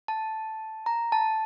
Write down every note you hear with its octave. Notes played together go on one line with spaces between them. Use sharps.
A5
A#5
A5